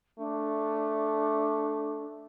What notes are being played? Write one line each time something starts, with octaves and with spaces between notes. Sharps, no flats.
A3 D4